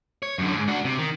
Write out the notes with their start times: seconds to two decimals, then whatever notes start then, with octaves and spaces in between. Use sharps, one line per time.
0.23 C#5
0.38 F#2 D3
0.55 G#2
0.68 D4 F#4
0.85 C3
0.98 D#3